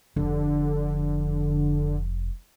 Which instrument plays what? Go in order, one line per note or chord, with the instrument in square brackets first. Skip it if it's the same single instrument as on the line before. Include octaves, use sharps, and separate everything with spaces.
[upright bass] F1 F3 [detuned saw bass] D3